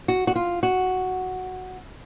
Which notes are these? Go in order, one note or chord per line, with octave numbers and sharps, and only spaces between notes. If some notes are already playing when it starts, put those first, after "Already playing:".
F#4
F#4
F4
F#4